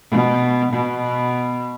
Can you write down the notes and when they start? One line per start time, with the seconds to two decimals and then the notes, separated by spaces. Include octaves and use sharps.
0.10 B2
0.72 B2